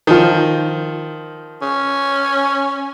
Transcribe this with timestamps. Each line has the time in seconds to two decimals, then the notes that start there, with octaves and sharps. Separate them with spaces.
0.07 D#3 F3
1.62 C#4